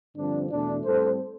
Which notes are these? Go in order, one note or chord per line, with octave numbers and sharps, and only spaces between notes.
G2 D3 F3 C4 D4
E2 B2 A3 D4
A2 G3 C4 A4 C5